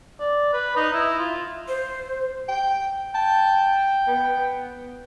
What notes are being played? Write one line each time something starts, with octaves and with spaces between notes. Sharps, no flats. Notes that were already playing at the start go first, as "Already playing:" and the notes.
D5
B4
D#4
E4
F4
C5
G5
G5 A5
B3